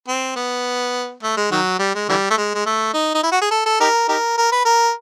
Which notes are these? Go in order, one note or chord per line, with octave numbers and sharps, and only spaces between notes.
C4
B3
A3
G#3
D#3 F#3
G3
G#3
D3 E3 G3
A3
G#3
G#3
A3
D#4
D#4
E4
F#4
G#4
A4
A4
D#4 G4 A#4
D#4 G4 A#4
A#4
B4
A#4